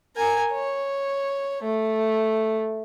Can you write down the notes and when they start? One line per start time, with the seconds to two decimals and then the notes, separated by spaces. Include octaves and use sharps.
0.16 A#4 G#5
0.52 C#5
1.63 A3